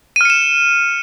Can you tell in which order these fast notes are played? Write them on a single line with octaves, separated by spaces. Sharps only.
D#7 F6 C#7 E7